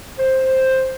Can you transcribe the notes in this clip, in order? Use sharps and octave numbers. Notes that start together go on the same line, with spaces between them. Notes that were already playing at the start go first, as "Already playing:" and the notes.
C5